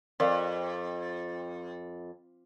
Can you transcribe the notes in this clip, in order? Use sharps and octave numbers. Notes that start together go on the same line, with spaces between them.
F2 A#4 D5 F5